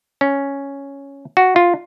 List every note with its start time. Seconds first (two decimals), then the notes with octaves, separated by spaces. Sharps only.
0.21 C#4
1.37 F#4
1.56 F4